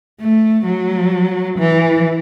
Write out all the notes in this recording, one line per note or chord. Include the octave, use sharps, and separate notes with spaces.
A3
F#3
E3